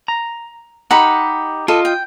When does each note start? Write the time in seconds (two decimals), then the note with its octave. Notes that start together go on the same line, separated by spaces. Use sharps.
0.08 A#5
0.91 D#4 G4 F#5 B5
1.68 F4 A4 D#5
1.85 G5